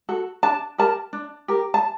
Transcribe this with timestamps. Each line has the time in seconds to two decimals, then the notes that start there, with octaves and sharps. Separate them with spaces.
0.09 F#4 A4
0.43 D4 A5
0.78 G4 A#4 A5
1.13 D4
1.48 G4 A#4
1.74 A5